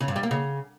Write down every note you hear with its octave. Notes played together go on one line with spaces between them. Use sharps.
C#3
G2
G3
A#3
C#3